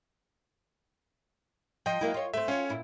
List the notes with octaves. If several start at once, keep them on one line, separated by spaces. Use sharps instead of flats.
F3 D#5 G5
F#3 A#3 E4
F4 C#5
A3 C4 E5
C#4 F4 C#5
A#2 E4